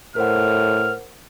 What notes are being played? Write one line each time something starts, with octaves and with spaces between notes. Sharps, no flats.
A2 A#4 C5 F#5 F6